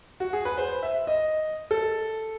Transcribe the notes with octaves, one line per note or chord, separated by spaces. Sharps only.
F#4
G#4
B4
C5
E5
D#5
A4